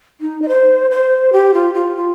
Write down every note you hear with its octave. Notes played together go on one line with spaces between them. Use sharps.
D#4
D#5
C5
C5
G4
F4
F4
F4